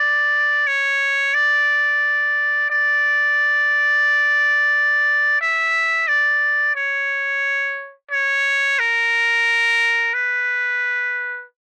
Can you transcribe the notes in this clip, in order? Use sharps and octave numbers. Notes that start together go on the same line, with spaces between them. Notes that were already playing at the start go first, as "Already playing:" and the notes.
Already playing: D5
C#5
D5
D5
E5
D5
C#5
C#5
A#4
B4